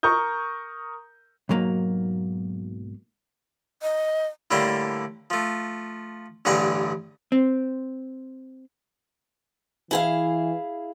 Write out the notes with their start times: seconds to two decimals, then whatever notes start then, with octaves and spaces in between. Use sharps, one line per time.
0.03 A#4 A#5 C#6 D#6 G6
1.49 B1 G#2 F#3 A#3
3.82 D#5
4.51 A2 D3 G3 A#3 A#5 C6
5.30 F3 A3
6.45 A1 G2 D3 G#4 F#5 A#5
7.32 C4
9.91 E3 E4 G#4 F5